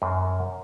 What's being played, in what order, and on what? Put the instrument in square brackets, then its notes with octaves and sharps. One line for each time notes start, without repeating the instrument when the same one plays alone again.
[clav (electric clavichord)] F#2